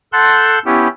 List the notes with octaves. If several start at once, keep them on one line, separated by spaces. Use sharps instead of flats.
A4 F#5 A5 C6 F#6 G6
B3 C#4 E4 G4